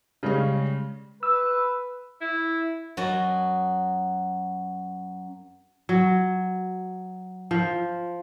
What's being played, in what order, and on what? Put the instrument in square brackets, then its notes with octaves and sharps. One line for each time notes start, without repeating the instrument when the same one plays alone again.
[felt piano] C#3 G3 G#3 C#4
[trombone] B4 [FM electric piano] E6
[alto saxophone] E4
[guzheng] F#2 F#3 F#4 D#5 A5
[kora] F#3
F3